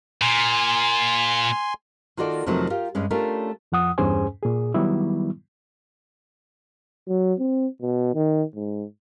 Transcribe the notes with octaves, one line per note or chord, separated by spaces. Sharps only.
A#2 G#5 C6
D#3 A#3 F4 F#4 A4 D5
F2 C3 D#3 F3 F#3 A3
F4 G4 A#4
G2 G#3 C#4
A3 C#4 D4 F4 G4 A#4
F2 F3 F#5 D#6
E2 G2 C#4 G#4 C5 G#5
A#2 G#4
D#3 F#3 G3 B3 E4
F#3
C4
B2
D#3
G#2